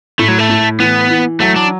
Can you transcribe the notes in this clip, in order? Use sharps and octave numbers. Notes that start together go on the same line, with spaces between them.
A2 A3
F#3
A3
A2
E3 B3
E3
F#3 A3
D4